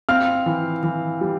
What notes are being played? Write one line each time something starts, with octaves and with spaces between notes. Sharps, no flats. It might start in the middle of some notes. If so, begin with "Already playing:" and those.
C4 F5 F6
E3
E3
G3